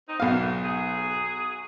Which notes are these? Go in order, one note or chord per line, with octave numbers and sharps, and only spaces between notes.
C4 D#4
B1 E3 F#3 A#3 F5
F#3 G#4